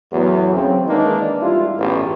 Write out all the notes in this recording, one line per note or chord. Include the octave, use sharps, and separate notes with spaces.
E2 A2 F#3
C#3 F#3 C4
D#3 E3 G#3 A#3 D4 D#4
G#1 G3 E4 F4
A1 E2 G2